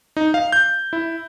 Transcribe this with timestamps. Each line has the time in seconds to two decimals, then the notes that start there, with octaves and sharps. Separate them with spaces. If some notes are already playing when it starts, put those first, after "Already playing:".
0.17 D#4
0.34 F5
0.52 G6
0.93 E4